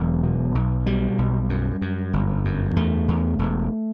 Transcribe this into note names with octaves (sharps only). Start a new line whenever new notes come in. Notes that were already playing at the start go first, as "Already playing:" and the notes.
Already playing: E1 E2 F#3
B2
B1
B2 G3
B1
F#2
F#2
G1
F#2
E2 A3
E2
E1